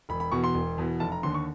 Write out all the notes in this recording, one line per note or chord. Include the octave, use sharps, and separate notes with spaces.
E1 B5
B5
E2 B2 C#6
C6
E1
E2 B2
F1 A5
A#5
D#2 D3 C6
C#6